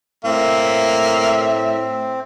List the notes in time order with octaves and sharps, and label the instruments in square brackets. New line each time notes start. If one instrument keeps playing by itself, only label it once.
[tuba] A2 [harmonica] A#3 [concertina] C4 [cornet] E5